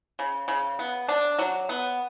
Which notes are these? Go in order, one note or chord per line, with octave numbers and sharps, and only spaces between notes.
C#3
C#3
B3
D4
F#3
B3